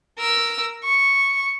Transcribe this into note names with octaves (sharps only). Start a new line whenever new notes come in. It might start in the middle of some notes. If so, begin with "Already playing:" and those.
A#4 E6
C#6